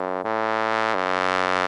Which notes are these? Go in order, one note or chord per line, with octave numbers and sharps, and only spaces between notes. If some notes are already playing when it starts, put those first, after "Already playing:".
Already playing: F#2
A2
F#2